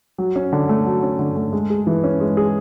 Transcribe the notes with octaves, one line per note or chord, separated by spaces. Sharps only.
F#3
C#4
D3
A3
F#3
C#4
D3
A3
G#3
G#4
E3
C#4
G#3
G#4